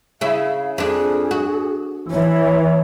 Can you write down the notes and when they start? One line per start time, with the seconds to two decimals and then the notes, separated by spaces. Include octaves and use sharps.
0.21 C#3 E4 F5
0.78 F2 D4 G#4
1.31 F#4
2.11 E3 C#5